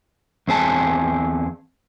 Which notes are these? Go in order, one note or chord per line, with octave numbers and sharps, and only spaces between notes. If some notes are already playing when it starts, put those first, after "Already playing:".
E2 C4 G#4 A5